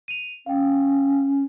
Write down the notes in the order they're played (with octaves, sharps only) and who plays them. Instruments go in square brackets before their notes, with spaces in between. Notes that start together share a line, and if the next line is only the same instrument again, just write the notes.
[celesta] D#7 F7
[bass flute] C#4 [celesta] F5 G5